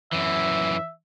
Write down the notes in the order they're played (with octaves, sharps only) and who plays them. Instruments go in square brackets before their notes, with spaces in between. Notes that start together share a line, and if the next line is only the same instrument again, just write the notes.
[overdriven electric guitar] F#2 E3 [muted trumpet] E5